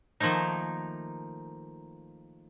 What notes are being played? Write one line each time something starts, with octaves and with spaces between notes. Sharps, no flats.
D#3 F3 A3 A#3 D#4